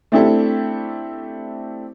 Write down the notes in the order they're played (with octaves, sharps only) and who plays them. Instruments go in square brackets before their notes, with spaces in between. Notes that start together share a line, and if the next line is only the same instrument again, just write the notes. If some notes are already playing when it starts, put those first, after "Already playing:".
[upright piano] A3 C4 D4 E4 G4 A4